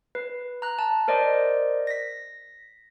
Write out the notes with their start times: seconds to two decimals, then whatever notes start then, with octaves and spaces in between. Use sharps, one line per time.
0.15 B4
0.62 A#5 F#6
0.79 A5
1.08 A#4 C5 D5 D#5
1.87 A#6 B6